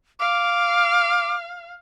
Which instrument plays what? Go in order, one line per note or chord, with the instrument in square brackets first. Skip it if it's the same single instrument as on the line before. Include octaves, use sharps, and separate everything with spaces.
[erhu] F5 [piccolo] D6